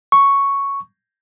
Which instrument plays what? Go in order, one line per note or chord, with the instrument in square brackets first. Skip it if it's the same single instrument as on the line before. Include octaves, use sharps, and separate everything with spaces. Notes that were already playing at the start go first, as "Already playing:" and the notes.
[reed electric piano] C#6